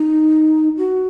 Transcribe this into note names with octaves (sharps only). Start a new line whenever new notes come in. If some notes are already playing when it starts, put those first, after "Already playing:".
Already playing: D#4
F#4